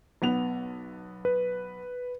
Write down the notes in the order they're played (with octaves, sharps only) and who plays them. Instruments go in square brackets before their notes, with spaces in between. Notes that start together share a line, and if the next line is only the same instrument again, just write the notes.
[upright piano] B1 B3 F7
[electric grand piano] B4